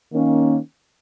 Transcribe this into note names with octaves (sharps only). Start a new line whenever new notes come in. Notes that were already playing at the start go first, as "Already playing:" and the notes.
D#3 A#3 C#4